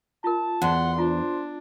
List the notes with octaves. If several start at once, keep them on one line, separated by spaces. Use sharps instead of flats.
F4 A#4 A5
E2 C5 F#5 C6
D4 F4 C5